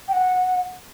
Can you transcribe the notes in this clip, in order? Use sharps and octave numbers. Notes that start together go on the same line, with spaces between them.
G5
F#5